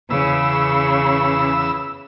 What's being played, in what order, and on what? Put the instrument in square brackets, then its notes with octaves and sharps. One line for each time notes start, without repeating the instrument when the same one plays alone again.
[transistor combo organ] E2 B4 E6 [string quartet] C#3